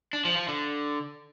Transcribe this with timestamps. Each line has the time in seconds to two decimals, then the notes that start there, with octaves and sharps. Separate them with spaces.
0.13 D4
0.25 F3
0.37 F3
0.48 D3